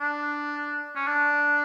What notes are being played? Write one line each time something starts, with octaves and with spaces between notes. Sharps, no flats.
D4
C#4
D4